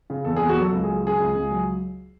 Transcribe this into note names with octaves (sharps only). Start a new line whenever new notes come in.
C#3
E2 A4
E2 G#4
F#4
F#3 A4
C#2
F#3 G#4
C#3 G#4
C#2
C#2
F#3